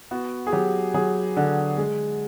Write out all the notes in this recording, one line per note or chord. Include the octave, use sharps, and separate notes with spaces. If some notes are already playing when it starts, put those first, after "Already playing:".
B3 F#4
G#4
F#3 G4
F#3 G#4
D3
G#3